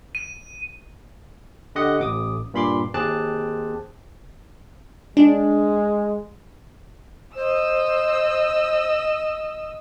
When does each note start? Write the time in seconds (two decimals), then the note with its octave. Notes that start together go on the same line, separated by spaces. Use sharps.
0.15 D#7
1.75 D3 G4 D#5 F#5
2.00 A1 D6 D#6
2.54 G2 A#2 B5 C6 D6
2.94 D#2 C4 G#4 A5 D6 F#6
5.17 G#3 D4
7.35 C5 D#5 E6